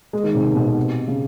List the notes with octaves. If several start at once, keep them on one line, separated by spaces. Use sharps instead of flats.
G#3
D#3
C3
C3
B2
C3
C#3